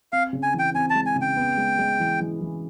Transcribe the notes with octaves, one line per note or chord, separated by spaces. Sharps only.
C4 F5
C#3
G#5
E3
G5
C4 G#5
A5
G#3
G#5
C#3
G5
B3
G#3
G#3
E3
E3
E3